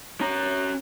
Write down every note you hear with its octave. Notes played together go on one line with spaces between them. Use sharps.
C#4 A#5